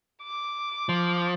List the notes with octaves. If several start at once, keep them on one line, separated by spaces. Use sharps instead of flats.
D6
F3